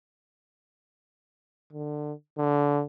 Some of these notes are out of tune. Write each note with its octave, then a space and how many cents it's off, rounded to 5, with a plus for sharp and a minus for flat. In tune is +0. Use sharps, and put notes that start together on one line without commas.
D3 +20
D3 -20